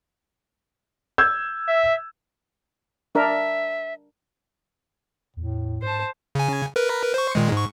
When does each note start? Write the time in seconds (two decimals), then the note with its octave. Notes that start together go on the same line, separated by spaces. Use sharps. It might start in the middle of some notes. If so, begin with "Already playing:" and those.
1.18 E6 G6 G#6
1.68 E5
3.15 D4 A#4 E5
5.37 E2 A2
5.82 G#2 C5 A5
6.35 C#3 G#5
6.76 A#4 B4
7.14 C5 C#6
7.35 A#2 D#3 G#3
7.52 G#2 C#6